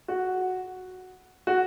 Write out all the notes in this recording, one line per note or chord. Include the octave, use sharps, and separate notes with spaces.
F#4
F#4